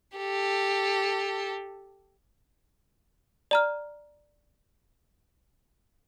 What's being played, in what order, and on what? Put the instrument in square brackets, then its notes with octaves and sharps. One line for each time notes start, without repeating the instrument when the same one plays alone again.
[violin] G4 A4
[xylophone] D5 A#5 F6